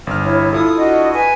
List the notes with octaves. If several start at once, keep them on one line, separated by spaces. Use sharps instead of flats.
G1 F6
E4 C#5
E4 F4 A4 D#6
D4 F#4 D#5
B4 G#5